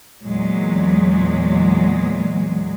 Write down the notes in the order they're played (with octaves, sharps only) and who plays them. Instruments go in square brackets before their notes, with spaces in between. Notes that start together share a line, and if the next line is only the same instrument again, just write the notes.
[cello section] E2 A#2 F#3 G#3